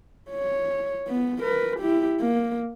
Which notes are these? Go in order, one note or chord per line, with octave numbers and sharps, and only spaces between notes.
C#5
B3
A#4 B4
E4 G4
A#3